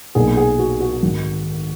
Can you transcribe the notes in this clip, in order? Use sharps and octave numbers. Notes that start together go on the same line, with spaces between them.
B1 A#2 G#4
G#4
F#4
F#4
G#1 G#2 D#3